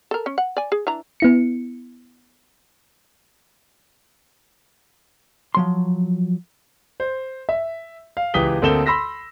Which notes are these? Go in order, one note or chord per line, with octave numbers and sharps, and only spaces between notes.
A4 A#4
C#4
F#5
D5 G#5
G#4
E3 D4 A#5
B3 E4 C#7
F3 F#3 C6
C5
E5
F5
C#2 E3 G4 D#6 B6 G7
D2 A#3 C4 A4 E7 G7
B5 C6 E6 A#6 B6